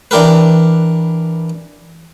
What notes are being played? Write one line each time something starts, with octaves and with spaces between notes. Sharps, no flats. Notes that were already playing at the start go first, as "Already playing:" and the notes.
E3 D4 G4 A#4 B4